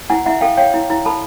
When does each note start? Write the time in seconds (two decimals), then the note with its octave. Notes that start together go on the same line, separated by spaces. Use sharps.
0.10 E4 F#5 G#5
0.26 E4 E5 F#5
0.41 A4 F5 G5
0.57 C#5 F5 G5
0.74 E4
0.90 E4
1.05 A4 A5 B5